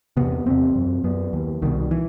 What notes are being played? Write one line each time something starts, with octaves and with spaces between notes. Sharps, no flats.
E2 C3 B3
E2 C3 C4
F#2
F#2 B3
D#2
C2 B2 D#3
E3